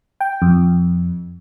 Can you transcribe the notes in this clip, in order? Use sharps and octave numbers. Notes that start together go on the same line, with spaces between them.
G5
F2